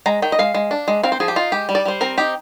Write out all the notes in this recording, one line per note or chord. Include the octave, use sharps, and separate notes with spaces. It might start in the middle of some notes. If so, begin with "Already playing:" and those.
G#3 A#5
D#3 G5
D#5
G#3 F5
G#3
D4
G#3
C4 F5
C5
F3 G#4
G4
D#4 F4
G#3 G4
G3
D5
G3 C5
C4 A#4
D#4 G4